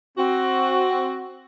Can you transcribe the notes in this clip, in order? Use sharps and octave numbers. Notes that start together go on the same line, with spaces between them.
C4 F#4